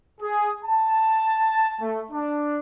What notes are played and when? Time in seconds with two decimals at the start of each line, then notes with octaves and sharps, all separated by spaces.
0.21 G#4
0.65 A5
1.82 A3
2.11 D4